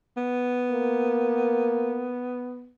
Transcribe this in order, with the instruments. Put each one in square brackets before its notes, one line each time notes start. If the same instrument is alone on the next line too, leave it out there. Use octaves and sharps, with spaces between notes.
[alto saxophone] B3
[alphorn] A#3